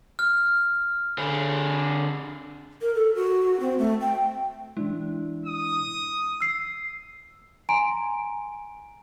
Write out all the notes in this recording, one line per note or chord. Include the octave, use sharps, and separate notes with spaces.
F6
D3 G#4
A#4
A4
F#4
C4
A3
G5
E3 G#3 D4 E4
D#6
E6 C7
G#5 A#5 C6 D7